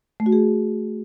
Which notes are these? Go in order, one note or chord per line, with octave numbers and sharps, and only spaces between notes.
A3
F#4
G#4